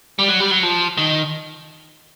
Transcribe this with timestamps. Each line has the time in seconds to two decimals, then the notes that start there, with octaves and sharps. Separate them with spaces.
0.19 G3
0.28 F#3
0.40 G3
0.51 F#3
0.63 F3
0.97 D#3